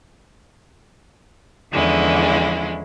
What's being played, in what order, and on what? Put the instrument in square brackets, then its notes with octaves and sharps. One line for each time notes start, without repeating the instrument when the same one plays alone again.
[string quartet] E2 D3 F3 G#3 C#4 E4